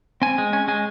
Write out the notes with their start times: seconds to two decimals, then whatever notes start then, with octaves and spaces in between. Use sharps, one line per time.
0.22 C4 G#5
0.38 G#3
0.53 C#4 G#5
0.68 G#3 G#5